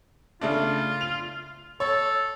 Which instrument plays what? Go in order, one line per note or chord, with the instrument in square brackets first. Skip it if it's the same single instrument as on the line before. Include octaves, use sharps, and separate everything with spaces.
[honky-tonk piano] C#3 A3 D4 [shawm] F4
[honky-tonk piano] F7
[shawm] A4 [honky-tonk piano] C#5